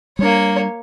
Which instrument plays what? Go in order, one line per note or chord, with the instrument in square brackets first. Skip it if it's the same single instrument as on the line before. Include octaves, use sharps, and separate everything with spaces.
[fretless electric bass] G3 D4 [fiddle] A#3 C#5